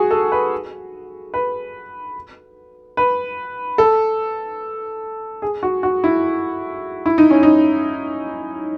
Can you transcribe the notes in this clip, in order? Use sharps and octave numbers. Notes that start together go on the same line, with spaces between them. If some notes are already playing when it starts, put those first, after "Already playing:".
Already playing: F#4 G#4
A4
B4
B4
B4
A4
G#4
F#4
F#4
E4
E4
D#4
C#4
D#4